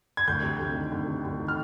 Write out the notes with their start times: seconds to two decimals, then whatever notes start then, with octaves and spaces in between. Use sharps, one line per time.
0.17 G#6
0.28 D2 G6
0.43 C3
0.59 D2
0.75 D#3
0.92 D2
1.07 C3
1.24 D2
1.40 D#3
1.48 F6